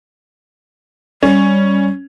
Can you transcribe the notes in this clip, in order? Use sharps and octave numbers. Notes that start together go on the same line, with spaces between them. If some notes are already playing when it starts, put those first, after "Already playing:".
G3 C#4